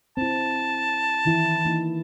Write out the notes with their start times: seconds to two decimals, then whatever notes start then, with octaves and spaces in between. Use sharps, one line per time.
0.17 C4 E4 A5
1.25 D#3 E3 E4
1.65 E3 A#3 D#4